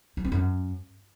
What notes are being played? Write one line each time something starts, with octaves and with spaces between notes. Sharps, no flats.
F#3
C4
F#2